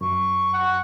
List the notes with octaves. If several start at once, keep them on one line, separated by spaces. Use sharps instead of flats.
F#2 C#6
F#5